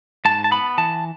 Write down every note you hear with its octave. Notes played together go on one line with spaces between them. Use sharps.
G#2 A5
A5
B3 B5
E3 A5